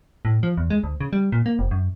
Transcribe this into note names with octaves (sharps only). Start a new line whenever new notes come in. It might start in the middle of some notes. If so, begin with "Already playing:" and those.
A2
F3
E2
G#3
D2
C#3
G3
A#2
A#3
F1
F#2